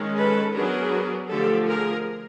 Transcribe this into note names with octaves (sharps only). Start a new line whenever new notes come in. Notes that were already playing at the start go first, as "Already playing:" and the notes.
Already playing: D#3 G#3 C#4
A4 B4
F#3 B3 D4 G#4 A#4
D3 F3 A3 G4 A4
G#4 A#4